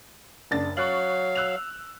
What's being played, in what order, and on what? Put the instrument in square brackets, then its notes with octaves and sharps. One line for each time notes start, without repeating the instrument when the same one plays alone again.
[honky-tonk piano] F#1 D4 A6
[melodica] F#3 F5 [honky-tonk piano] C#6 F#6 F#7
[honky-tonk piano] E6 F#6 F7